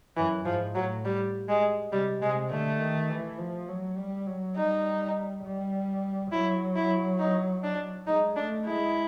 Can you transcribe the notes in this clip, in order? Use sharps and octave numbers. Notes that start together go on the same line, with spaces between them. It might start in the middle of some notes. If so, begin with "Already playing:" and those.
F#2 E3
G#2 F3
A2 F#3
G3
G#3
C3 G3
C3 G#3
D3 A3
D#3
E3
F3
F#3
G3
F#3
G3 D#4
G3
F#3 E4
E4
D#4
D4
G#3 D#4
A3 D4
G#3 E4